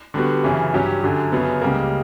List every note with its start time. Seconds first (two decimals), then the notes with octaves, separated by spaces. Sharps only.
0.14 D3 G3 B3 F#4
0.44 F#2 C#3 E3
0.73 G2 F#3 C#4 G4
1.02 F#2 D3 F#3
1.32 F#2 C#3 F#3 B3
1.61 C#2 C#3 G3 A#3